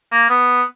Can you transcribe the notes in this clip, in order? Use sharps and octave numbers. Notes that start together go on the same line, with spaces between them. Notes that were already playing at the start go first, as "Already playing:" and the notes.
A#3
B3